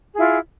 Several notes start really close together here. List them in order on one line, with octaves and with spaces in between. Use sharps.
G#4 E4 F4